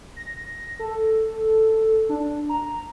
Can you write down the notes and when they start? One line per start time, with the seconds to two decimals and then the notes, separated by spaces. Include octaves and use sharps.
0.16 A#6
0.79 A4
2.09 D4
2.49 A#5